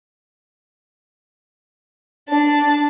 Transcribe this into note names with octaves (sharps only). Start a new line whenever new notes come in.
D4 A5